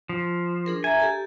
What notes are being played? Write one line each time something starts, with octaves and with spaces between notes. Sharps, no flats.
F3
D4 G#4 A#4
E5 G#5 A#5
G4 A4 A5